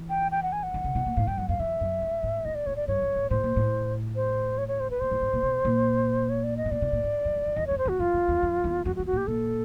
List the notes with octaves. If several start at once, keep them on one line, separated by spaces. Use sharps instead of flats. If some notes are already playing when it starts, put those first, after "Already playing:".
Already playing: E3
G5
G5
F#5
G#5
F#5
D#3
C#3
B2
A#2
A2 F5
G2 G5
F#2 F#5
F#2 F5
F2 E5
F#2
G2
G#2
A2 D#5
D5
A2 C#5
D5
G2 C#5
G2
G#2
A2 C5
A#2
A2
C5
C#5
C#5
C5
B4
A#2 C5
A2
G#2
A#2
B2
A#2
C#5
D5
D#5
A2
A#2 D5
B2
A#2
G#2
F2
F2
F2
E2 D#5
F2 C#5
C5
E2 F#4
F2 F4
F2
E2
F2
E2
F2 F#4
F#4
E2
F#4
A#2 G4
A#2 A4